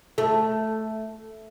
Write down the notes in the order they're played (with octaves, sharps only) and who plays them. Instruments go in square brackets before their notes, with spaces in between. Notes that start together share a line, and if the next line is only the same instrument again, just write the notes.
[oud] A3